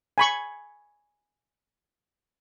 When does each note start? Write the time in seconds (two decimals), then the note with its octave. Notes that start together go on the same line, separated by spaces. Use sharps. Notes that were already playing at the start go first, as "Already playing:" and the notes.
0.18 G#5 B5 C#6